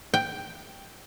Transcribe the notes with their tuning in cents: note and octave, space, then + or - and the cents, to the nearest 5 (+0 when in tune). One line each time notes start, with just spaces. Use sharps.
G5 +5